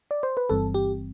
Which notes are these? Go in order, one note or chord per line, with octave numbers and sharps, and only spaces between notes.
D5
C5
B4
G1 G2 E3 G3 C4 A4
G4